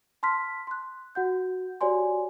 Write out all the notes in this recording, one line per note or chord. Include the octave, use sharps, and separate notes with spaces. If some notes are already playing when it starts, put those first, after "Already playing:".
A5 C6 F6 B6
C6 F#6
F#4 F#5 G6
F#4 G4 C#5 D5 G#5 C6